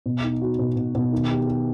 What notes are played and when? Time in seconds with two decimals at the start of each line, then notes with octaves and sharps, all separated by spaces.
0.06 B2
0.24 D#4
0.42 F#4
0.59 B2
0.76 B2
0.95 B2
1.12 D#3
1.30 G4
1.48 G4